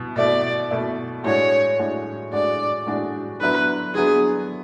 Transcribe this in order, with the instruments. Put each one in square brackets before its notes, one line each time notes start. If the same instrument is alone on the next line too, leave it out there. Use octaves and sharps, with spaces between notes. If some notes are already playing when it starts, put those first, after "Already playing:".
Already playing: [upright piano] B2 E4
[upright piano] B2 A3 E4 [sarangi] D5
[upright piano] B2 A3 E4
[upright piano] A2 G#3 D4 F#4 [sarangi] C#5
[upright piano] A2 G#3 D4 F#4
[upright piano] A2 G#3 D4 F#4 [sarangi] D5
[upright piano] A2 G#3 D4 F#4
[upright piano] D3 F#3 B3 E4 [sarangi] B4
[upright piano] D3 F#3 B3 E4 [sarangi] G#4